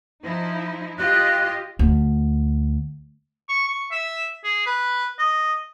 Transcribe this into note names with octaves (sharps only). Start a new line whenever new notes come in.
F3 D#4 E4
F4 G4 D#5 F#6
D2
C#6
C#6
E5
G#4
B4
D#5